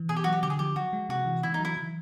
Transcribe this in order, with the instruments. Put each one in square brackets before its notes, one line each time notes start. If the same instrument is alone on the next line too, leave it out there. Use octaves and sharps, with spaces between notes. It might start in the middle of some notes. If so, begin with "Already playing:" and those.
Already playing: [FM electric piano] E3
[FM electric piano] B2 [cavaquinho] G#4
[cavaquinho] G4
[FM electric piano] F#3 [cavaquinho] F#4
[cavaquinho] G4
[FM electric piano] D3 [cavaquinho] G4
[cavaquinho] G#4
[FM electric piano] F3 [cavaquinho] G4
[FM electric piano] F3 [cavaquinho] F#4
[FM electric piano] G#3
[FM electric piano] C3 [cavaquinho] F#4
[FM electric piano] E3
[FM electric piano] C#3 [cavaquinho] E4
[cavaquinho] D#4
[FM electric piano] F#3
[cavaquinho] E4
[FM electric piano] E3